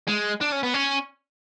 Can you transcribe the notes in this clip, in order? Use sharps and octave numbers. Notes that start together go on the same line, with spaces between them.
G#3
D4
C#4
B3
C#4